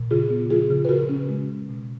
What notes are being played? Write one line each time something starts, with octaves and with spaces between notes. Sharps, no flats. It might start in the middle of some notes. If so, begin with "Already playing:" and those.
Already playing: A#2
C#3 F4 G#4
B3
F3 F4 G#4
C#3
B4
C#3 F#4 A#4
C#4
G#3
C#3
B2